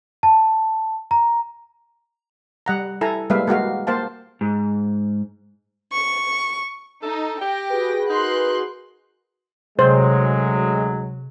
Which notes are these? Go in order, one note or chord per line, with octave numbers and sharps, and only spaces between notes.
A5
A#5
G3 F#5 A#5
E4 A4 G#5 A#5
G3 G#3 A#3 B4 E5 F5
G#3 A#3 F#4 F5
A#3 C5 F5 A5
G#2
C#6
D#4 A4
G4 G5 A#6
F#4 G#4 B4
D#4 A#4 C6 F#6
D2 C3 F#3 G#3 C5